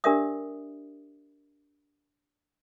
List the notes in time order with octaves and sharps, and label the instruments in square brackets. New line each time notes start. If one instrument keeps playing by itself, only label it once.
[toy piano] D4 G4 A#4 D5 E5 D#6